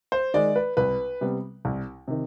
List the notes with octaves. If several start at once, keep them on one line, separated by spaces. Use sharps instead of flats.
C5
D#3 G#3 D5
B4
C2 B4
C3 G3 B3
C2
C3 D#3